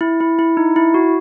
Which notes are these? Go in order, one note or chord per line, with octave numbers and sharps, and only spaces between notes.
E4
E4
E4
D#4
E4
F#4